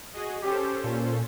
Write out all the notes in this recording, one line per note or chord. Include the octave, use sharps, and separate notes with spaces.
F#4 G#4 D#5
C#4 G4 A4 C5
A#2